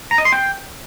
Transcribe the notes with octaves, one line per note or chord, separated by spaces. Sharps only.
A#5
D#5
C6
G5